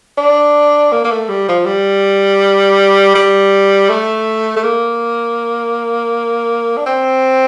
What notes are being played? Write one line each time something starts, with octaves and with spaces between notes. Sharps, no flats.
D4
A#3
A#3
A3
G3
F3
G3
G3
A3
A3
A#3
D4
C4